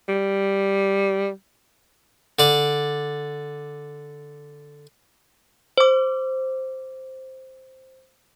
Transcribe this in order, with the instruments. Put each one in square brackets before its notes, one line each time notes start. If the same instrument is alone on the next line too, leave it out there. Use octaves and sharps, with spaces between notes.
[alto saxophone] G3
[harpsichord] D3 D5
[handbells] C5 D6